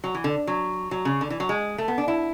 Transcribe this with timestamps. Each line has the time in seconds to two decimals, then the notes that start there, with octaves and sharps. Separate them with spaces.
0.04 F#3
0.15 E3
0.24 D3
0.47 F#3
0.91 F#3
1.05 C#3
1.21 D3
1.30 E3
1.40 F#3
1.49 G#3
1.78 A3
1.88 B3
1.98 D4
2.08 E4